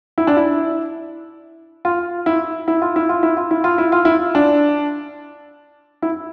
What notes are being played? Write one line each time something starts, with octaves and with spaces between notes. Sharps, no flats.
E4
D4
E4
F4
E4
E4
F4
E4
F4
E4
F4
E4
F4
E4
F4
E4
D4
E4